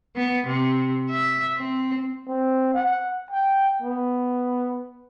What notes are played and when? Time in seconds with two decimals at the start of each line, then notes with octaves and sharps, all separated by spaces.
0.16 B3
0.47 C3
1.10 E5
1.57 C4
2.28 C4
2.74 F#5
3.31 G5
3.82 B3